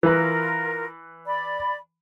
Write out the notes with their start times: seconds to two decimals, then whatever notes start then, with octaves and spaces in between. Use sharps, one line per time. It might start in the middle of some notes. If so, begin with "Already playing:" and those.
0.03 E3 F4 A#4 B4
1.25 D5 B5